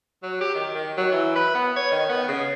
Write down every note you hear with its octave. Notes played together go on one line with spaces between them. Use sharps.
F#3
G4
D#3
D#3
F#3
E3
B4
B3
C#5
D#3
B3
C#3